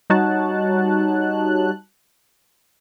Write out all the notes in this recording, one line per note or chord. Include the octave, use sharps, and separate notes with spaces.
G3 D#4 F#4 C#5 A5 F#6